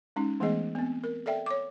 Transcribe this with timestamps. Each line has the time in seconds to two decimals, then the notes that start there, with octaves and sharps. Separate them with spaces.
0.16 G#3 C#4 D#4
0.40 E3 G#3 A3 B3 G#4 D#5
0.75 B3 C4
1.04 A#4
1.26 A4 D5 E5 G5
1.46 C#5 D6